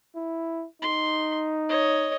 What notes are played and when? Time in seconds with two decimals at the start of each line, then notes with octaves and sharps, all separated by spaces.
0.16 E4
0.82 D#4 C6
1.69 C#5 D#5